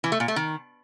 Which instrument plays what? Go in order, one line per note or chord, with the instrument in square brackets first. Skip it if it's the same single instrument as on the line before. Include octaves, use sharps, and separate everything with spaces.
[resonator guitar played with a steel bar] E3
A3
A#2
A3
D#3